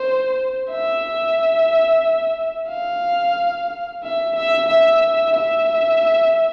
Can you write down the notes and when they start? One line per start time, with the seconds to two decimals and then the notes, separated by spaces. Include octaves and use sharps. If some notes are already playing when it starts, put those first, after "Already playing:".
Already playing: C5
0.71 E5
2.70 F5
4.03 E5
4.36 E5
4.69 E5
5.35 E5